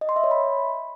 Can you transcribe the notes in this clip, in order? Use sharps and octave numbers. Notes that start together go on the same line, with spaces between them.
D#5
C6
E5
C#5
B5